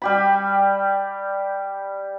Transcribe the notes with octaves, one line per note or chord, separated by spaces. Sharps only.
G3 G4 B5